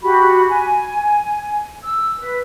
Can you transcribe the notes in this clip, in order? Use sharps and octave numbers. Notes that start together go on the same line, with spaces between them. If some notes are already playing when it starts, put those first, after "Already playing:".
F#4 G4 B5
G#5
E6
B4